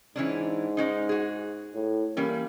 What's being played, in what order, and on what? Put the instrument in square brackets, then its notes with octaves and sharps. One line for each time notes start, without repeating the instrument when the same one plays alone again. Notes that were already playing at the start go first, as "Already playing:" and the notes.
[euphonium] G#2 [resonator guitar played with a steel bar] E3 C#4 D4
[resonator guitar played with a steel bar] G#3 C#4 D#4
F#4 G#4
[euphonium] A2
[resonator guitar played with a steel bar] E3 G3 C#4 [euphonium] A#3